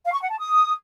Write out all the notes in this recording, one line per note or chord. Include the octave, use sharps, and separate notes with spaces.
F5
C#6
F#5
A5
D#6